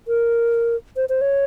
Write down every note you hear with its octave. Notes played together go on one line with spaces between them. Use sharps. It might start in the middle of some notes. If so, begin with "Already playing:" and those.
A#4
C5
C5
C#5